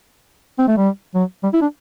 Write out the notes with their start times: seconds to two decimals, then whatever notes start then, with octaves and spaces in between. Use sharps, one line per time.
0.59 C4
0.68 A3
0.77 G3
1.15 F#3
1.43 G3
1.53 E4
1.62 D4